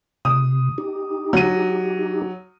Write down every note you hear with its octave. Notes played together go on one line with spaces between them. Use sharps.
C3 D#6
D#4 G4
F#3 D#7